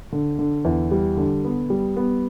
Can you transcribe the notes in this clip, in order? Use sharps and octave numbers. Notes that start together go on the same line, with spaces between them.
D3
D3
E2
G3
D3
B3
G3
B3